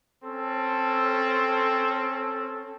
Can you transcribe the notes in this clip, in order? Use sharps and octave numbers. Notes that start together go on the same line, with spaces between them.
C4 C#4 A4